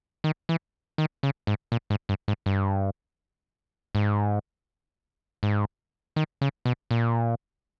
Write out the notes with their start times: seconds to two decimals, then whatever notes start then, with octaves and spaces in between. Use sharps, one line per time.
0.24 D#3
0.49 E3
0.98 D#3
1.23 C#3
1.47 G#2
1.72 A#2
1.90 G#2
2.09 G2
2.28 G#2
2.46 G2
3.95 G#2
5.43 G#2
6.16 D#3
6.41 C#3
6.65 B2
6.91 A#2